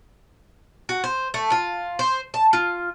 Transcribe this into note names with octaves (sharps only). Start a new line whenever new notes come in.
F#4
C5
A3
F4
C5
A5
F4